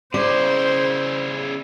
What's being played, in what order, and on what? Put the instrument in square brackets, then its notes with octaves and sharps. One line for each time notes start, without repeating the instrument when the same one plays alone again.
[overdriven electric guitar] C#3 E4 [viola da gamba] C5 [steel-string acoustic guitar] D5